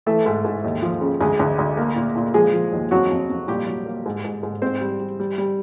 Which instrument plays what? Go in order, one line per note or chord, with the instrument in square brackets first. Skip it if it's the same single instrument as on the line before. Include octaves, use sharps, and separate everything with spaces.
[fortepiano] E3 A3 A4
G#2
G#2
D#2
F3
C#3
D2 G#3 G#4
D2
D2
A#3
A#2
A#2
F3 G#3 G#4
F3
D#2
F2 F#3 F#4
F2
F2
A#2 G3 G4
F#3
A#3
G#2
G#2
G#2
G#2 C4 C5
G3
G3
G3
G3